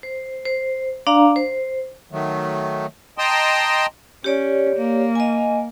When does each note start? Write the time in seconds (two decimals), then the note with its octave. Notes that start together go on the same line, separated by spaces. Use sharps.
0.03 C5
0.46 C5
1.07 D4 D5 F5 A#5
1.36 C5
2.11 D#3 F#3 A3
3.18 D#5 G5 A5 A#5 C6 D#6
4.24 C#4 G4 C#5 D5
4.76 A#3
5.15 D#5 G#5